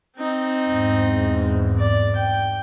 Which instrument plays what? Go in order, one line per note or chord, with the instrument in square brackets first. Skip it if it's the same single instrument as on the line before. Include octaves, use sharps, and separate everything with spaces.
[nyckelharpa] C4 D#4
[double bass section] E2 G#2
[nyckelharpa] D5
G5